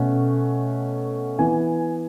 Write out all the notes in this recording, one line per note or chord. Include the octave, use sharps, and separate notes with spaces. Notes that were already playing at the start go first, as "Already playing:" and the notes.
Already playing: B2 A3 C#4 F#5
E3 B3 G#5